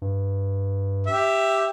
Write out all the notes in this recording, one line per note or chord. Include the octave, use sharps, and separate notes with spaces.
G2
G4 E5